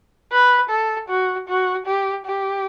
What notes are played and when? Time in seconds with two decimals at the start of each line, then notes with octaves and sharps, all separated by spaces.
0.32 B4
0.69 A4
1.09 F#4
1.48 F#4
1.86 G4
2.25 G4